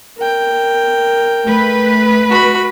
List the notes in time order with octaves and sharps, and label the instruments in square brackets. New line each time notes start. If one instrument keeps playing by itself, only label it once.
[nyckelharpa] A#4 G5
[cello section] A3 B4
[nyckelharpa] F#4 B5